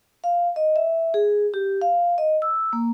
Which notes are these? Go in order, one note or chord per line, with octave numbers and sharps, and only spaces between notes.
F5
D#5
E5
G#4
G4
F5
D#5
E6
A#3